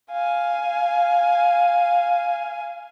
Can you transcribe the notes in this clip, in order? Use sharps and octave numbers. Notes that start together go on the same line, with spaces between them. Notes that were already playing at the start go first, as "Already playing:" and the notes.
F5 G#5